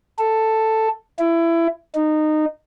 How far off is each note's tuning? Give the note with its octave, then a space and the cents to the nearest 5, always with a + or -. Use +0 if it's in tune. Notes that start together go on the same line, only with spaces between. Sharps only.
A4 +5
E4 +20
D#4 -20